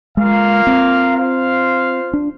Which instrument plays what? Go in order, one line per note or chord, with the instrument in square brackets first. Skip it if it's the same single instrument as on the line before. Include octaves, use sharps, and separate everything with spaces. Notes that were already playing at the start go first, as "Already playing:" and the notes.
[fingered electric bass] G#3 [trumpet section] A#3 F4 A#4 F5
[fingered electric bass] C4
[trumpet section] F4 C5 F5
[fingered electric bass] D4